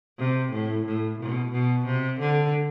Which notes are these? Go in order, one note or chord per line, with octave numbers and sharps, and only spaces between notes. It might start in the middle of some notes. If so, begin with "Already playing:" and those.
C3
A2
A2
B2
B2
C3
D3